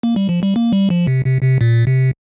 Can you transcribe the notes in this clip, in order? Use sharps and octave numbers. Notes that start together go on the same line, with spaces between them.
A#3
G3
F3
G3
A#3
G3
F3
C3
C3
C3
A#2
C3